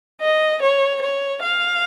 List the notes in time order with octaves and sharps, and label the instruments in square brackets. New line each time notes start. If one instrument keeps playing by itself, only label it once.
[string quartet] D#5
C#5
C#5
F5